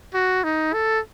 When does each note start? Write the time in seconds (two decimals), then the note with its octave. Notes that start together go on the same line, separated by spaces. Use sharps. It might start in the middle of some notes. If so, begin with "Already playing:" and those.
0.14 F#4
0.44 D#4
0.73 A4